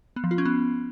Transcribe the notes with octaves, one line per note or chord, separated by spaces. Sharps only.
B3
F3
F4
C#4
B3